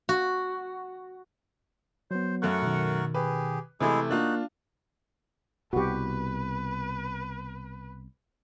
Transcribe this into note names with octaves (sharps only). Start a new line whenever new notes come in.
F#4
F#3 B3 C5
F#2 A3 A#4 F#5 C#6 F#6
B2 D#3
G4 G#4 B4
C3 E3 G#3 A3 E4 G#4
A#3 D4 D#4 F4 F#4 F#6
C2 B2 F#4 G4 B4